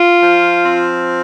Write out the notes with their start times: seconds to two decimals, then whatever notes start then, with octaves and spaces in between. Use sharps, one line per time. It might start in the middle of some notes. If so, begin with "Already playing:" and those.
Already playing: F4
0.21 F3
0.66 C4